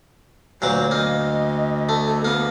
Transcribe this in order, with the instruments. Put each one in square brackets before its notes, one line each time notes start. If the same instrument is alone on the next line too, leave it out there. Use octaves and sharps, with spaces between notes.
[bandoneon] D2 [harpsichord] A#2 E3 F#3 [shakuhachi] C5
[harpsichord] A#3 [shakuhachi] D#5
[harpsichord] A3
[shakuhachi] A4
[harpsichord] A#3 [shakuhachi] B3